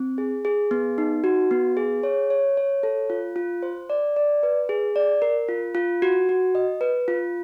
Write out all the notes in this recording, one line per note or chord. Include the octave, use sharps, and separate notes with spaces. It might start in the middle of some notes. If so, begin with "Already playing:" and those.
Already playing: C4
G#4
G#4
B3
D#4
F#4
B3
G#4
C#5
C#5
C#5
A4
F4
F4
C5
D5
D5
B4
G#4
D5
A#4
F4
F4
F#4
F#4
D#5
B4
F4